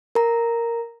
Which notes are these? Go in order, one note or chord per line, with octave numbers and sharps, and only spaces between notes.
A#4 A#5